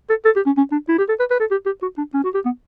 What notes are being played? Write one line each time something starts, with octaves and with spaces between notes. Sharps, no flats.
A4
A4
G4
C#4
C#4
D4
E4
G4
A4
B4
B4
A4
G4
G4
F#4
D4
C#4
F#4
G4
B3